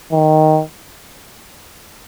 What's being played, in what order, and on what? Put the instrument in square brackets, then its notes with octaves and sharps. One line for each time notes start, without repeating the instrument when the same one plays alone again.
[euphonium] D#3